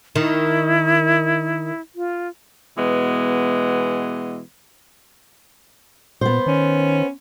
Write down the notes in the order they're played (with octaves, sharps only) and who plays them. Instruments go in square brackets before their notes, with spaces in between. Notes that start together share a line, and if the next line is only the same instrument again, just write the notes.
[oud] D#3 [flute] E4
[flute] F4
[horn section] B2 E3 G#3 B3
[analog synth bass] A#2 [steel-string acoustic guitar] B3 C5
[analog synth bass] D#3 [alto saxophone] C#4